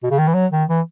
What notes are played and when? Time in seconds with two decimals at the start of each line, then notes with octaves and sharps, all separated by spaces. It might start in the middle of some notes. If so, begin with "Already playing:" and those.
0.03 B2
0.11 C#3
0.19 D#3
0.27 E3
0.34 F#3
0.52 D#3
0.69 E3